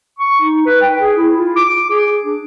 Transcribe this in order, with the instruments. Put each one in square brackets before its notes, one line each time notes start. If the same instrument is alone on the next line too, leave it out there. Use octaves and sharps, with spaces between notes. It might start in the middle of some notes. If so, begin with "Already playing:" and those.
[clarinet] C#6
D#4
B4
G5
G#4
E4
F4
D6
G#4
D4